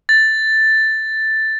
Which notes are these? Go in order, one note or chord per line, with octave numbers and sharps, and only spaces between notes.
A6